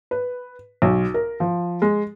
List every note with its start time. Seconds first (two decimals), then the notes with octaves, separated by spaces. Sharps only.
0.11 B4
0.82 B1
1.14 A#4
1.40 F3
1.82 G#3